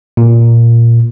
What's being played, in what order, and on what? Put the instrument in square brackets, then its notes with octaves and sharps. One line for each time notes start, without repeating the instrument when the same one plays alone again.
[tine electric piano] A#2